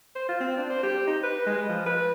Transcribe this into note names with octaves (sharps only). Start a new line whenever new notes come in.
C5
F4
C4
D4
C5
G4
D#4
B4
G#3
F3
B4